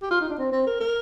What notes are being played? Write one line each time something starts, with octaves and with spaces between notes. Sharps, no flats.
G4
F4
D#4
D4
C4
C4
A#4
A#4